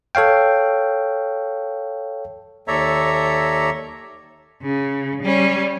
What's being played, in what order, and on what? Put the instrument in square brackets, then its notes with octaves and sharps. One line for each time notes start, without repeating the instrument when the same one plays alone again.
[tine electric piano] A4 C#5 F5 G5
[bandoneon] D#2 A4 C#5 D5 E5 A#5
[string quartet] C#3
G3 C#4